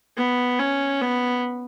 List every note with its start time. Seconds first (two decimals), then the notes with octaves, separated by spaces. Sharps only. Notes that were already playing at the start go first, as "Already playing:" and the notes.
0.17 B3
0.59 C#4
1.02 B3